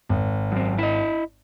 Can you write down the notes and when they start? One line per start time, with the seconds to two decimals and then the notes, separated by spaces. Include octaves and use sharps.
0.09 G#1
0.52 F#2 C4
0.79 E4 D#5